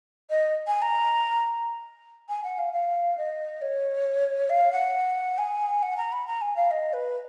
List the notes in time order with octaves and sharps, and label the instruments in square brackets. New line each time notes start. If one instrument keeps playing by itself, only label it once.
[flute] D#5
G#5
A#5
G#5
F#5
F5
F5
D#5
C#5
F5
F#5
G#5
F#5
A#5
B5
A#5
G#5
F5
D#5
B4